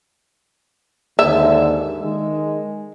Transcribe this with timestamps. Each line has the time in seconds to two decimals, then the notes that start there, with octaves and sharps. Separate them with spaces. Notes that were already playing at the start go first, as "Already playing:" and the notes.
1.19 D#2 G#2 D3 E5
2.00 D#3 G#3